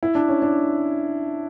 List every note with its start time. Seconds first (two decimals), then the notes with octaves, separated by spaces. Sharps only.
0.03 E4
0.15 D4
0.29 C#4
0.42 D4